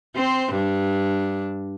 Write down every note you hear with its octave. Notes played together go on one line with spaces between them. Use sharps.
C4 C5
G2 D4